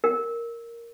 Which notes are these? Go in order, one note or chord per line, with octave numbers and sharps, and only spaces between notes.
A#4